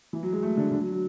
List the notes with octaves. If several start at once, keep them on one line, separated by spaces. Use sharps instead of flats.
E3
F#3
G#3
A3
D3
D3
F#3
F#3